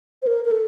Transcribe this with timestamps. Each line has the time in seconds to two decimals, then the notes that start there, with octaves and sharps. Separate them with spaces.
0.22 C5
0.27 A#4
0.45 A#4
0.51 A4